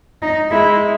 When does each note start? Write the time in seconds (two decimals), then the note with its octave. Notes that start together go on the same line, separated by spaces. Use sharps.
0.22 D#4
0.51 G#3 E4